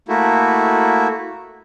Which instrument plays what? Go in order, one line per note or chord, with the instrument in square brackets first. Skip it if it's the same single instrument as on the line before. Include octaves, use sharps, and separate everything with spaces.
[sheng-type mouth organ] A3 A#3 E4 F#4